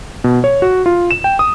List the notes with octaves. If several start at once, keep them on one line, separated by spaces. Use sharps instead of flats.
B2
C#5
F#4
F4
E7
G5
D#6